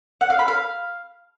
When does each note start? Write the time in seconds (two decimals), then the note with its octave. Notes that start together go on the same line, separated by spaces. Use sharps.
0.21 F#5
0.30 F5
0.39 B5
0.48 F5